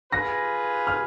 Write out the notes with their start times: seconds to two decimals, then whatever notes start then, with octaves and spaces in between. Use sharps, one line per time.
0.12 F4 G#4 B4 A#6
0.87 F6